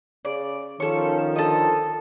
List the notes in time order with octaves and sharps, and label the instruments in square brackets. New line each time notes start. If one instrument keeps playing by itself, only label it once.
[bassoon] C#3 [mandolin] D5
[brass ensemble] D#3 F3 [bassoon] C#4 [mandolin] A4 C#6
[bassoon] D3 [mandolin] A4 D#5